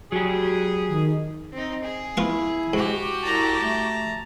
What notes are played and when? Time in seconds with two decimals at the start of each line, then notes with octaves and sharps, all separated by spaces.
0.12 F#3 G4 G#4
0.88 D#3
1.53 C4 D#4
1.84 G#4
2.17 B3 E4 F4 C#6
2.73 G#2 F#4 G4
3.23 C2 A5 A#5
3.63 A3